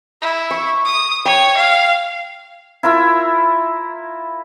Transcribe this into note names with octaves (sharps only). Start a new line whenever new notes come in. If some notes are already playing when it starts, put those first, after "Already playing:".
E4
C#6
D#6
C#5 G5
F5
E4 F4 A#4 E5